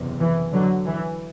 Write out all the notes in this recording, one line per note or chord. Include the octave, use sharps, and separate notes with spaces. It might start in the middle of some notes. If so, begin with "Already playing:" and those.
Already playing: F#1 E2 C3
E3
D3 F#3
E3